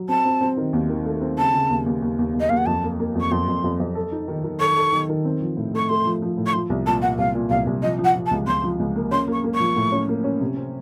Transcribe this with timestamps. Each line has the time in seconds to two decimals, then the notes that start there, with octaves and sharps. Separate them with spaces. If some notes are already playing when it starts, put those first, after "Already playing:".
Already playing: F#3
0.09 C4 A5
0.25 C4
0.41 C4
0.57 D#3
0.73 D#2
0.89 D#3
1.06 A3
1.21 C4
1.38 C#3 A5
1.54 C#3
1.70 D#2
1.86 D#2
2.02 D#2
2.19 D#2
2.34 D#2
2.40 D#5
2.49 D#2 F5
2.57 F#5
2.66 F2 A5
2.83 A#3
2.99 A#3
3.15 F2
3.21 C#6
3.31 F2 C6
3.48 F2
3.64 F2
3.80 F2
3.95 A4
4.12 D#4
4.28 D#3
4.44 D#3
4.60 A4 C#6
4.76 A4
4.92 D#3
5.09 D#3
5.25 C4
5.41 F3
5.57 A2
5.73 A3 C#6
5.89 A3 C6
6.05 F3
6.22 F3
6.38 A2
6.46 C#6
6.53 F3 C6
6.70 C2
6.86 A#2 A5
7.02 A#2 F#5
7.18 C2 F5
7.34 A#2
7.50 C2 F5
7.67 C2
7.82 F3 D#5
7.99 F3
8.04 F#5
8.15 F3
8.26 A5
8.31 C#2
8.47 C#2 C6
8.63 F3
8.79 C#2
8.96 A#3
9.11 C#4 C6
9.27 A#3
9.33 C#6
9.44 A#3
9.54 C#6
9.60 F3
9.76 A2
9.92 C#4
10.08 A#3
10.24 C#4
10.40 C3
10.56 C4